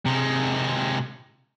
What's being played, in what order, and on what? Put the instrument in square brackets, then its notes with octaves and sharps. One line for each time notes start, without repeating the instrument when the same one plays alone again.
[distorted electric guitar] C3 G#3